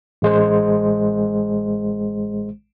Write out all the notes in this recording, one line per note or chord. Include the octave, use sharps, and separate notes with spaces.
A1 G#3 C5